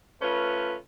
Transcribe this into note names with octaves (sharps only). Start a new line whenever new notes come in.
A3 C#4 F4 B4